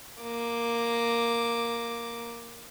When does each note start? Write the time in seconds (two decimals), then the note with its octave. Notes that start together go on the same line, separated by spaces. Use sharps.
0.22 A#3 D6